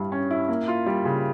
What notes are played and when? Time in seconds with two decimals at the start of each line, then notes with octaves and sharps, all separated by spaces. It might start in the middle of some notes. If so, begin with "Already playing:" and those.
Already playing: G2 G3 E4
0.12 C#4
0.31 E4
0.49 A#3
0.68 F4
0.86 G3
1.05 C#3